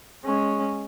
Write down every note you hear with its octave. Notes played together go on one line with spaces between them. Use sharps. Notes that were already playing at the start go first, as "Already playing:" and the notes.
G#3 C#4